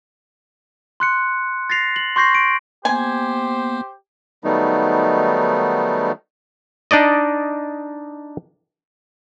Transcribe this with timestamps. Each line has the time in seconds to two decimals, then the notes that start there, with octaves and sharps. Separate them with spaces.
1.00 C6 F#6 C#7
1.70 A6 A#6 C7 F7
1.96 F#7
2.16 C6 C#6 G6 A#6 C7
2.35 D7
2.85 A#3 B3 G4 C5 G#5
4.44 D#3 F#3 G3 A3 B3 D#4
6.91 D4 D#4 D5 D#5